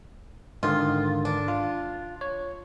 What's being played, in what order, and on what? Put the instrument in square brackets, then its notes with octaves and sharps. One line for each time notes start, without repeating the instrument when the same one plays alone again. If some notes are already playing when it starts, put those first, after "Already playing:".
[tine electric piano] G#2 D3 D#3 [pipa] F4
[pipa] D4
[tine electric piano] F4
C#5